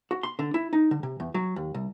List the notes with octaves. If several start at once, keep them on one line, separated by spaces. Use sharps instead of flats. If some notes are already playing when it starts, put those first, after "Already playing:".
F#4
C6
D3
E4
D#4
D3
C3
E2
F#3
D#2
C2